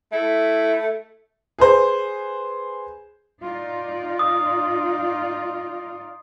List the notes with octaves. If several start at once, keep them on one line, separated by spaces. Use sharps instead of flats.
A3 E4
G#4 B4 C5
D#4 F4 D5
D#6